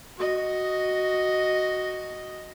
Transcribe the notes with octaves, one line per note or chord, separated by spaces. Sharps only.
F#4 D#5